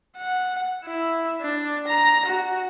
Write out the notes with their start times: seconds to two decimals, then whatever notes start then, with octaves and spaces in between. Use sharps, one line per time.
0.17 F#5
0.85 E4
1.42 D4
1.88 A#5
2.26 F#4